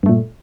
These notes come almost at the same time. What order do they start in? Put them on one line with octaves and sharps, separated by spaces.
G2 A3 A#2